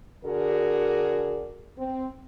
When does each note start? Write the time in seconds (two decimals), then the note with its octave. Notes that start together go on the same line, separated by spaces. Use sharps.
0.25 D3 F#4 G#4 A#4 D5
1.77 C4